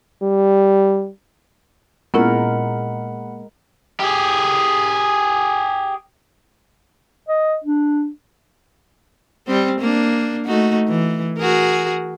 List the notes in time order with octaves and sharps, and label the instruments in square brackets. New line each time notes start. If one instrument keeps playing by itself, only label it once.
[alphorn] G3
[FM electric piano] A#2 [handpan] G#3 A#4 [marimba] B3 C#4 E4 [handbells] F#5 B5
[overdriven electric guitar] G4 G#4
[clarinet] D#5
D4
[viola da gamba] G3 C4
A#3 D4
A3 D#4 F#4
E3
F#4 G#4 A#4